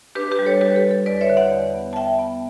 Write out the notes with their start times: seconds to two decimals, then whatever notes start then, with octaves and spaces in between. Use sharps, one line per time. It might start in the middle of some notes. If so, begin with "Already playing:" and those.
0.15 D4 G4 B4
0.31 G4 B4
0.39 G3
0.46 A4 C#5
0.61 G3 G4 B4
0.76 A4
0.84 G3
0.91 A4
1.06 E2 B4 D5
1.21 C#5 E5
1.29 D3
1.37 D5 F#5
1.52 E2
1.74 B3
1.93 A5
1.96 B3 E5 G5
2.19 B3